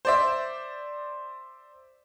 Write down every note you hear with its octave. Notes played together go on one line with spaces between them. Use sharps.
C5 D5 E5